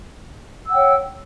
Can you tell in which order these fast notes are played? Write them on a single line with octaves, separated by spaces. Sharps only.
E6 F#5 G5 C#5